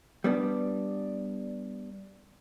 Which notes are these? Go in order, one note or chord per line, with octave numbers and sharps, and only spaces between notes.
G3 B3 D4